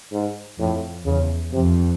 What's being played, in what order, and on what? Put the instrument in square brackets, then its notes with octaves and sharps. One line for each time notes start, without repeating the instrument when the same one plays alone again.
[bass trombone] G#2
[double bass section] F2 [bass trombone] A2
[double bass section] E2 [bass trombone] C#3
[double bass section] F2 [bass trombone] C3